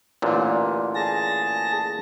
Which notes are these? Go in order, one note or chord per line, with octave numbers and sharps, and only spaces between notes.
A1 A#2 D3
G#4 A5 A#6